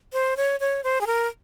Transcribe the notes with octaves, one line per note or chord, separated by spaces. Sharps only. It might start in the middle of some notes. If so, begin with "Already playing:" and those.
C5
C#5
C#5
C5
G#4
A#4